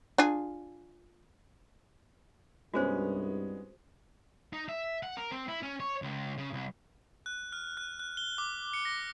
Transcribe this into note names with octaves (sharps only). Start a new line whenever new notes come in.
D4 F4 G#4
C2 G2 G#3 B3 C#4 F#4 G#4 C5
D#4
E5
F#5
A#4
C4
E4
C#4
C#5
C#2
C#3
C2
F#6
F6
F#6
F#6
G7
D6
C#7
A#6